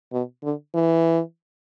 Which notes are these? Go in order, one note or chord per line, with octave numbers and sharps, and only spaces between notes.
B2
D3
E3